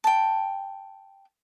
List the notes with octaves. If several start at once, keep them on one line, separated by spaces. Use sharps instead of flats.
G5 A5